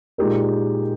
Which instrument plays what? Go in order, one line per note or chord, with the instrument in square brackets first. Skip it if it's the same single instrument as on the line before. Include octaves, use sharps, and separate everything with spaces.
[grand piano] A#2 G#3 D#4 G4 A#4